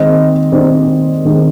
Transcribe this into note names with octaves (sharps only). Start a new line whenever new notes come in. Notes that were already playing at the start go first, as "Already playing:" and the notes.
Already playing: D#3 G#3 C4 D#5
D#3 G#3 C4 C5 D5
D#3 G#3 C4